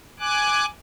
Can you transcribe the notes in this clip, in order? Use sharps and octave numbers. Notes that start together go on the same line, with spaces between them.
G#5 D6 F#6